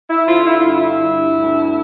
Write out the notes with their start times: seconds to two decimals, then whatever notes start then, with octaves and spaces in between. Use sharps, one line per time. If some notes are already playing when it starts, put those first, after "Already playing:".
0.08 E4
0.26 D3 F4
0.44 E4
0.58 G2 F4
0.72 E4
0.99 G2
1.35 D2